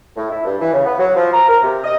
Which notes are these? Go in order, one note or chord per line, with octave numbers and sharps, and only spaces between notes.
A2
E4
G2
E3
C#3
B3
F#3
F3
A#5
A#4
C3
D#5